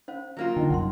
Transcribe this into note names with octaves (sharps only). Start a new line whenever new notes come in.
C#4 C5 F5
F#3 A#3 F4
D3 D#4 D#5 G5
C2 F#2 F#5 C6